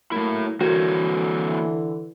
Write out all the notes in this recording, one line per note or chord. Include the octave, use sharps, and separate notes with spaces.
F#3 A3 A#3 E4
D3 E3 A#3 F#4 A#4 C5 C#5